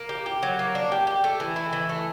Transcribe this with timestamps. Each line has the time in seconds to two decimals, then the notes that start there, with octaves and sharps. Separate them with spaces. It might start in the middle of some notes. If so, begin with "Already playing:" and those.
Already playing: A#3
0.09 G4
0.26 G4
0.43 F#3
0.59 A#3
0.75 D4
0.92 G4
1.07 G4
1.24 A3
1.40 E3
1.56 E4
1.73 E3
1.89 A3